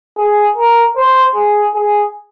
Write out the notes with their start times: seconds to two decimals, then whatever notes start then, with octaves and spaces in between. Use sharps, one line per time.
0.17 G#4
0.56 A#4
0.96 C5
1.35 G#4
1.74 G#4